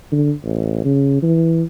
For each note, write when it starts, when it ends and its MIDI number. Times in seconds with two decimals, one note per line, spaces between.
0.12 0.33 50
0.44 0.82 33
0.85 1.20 49
1.22 1.63 52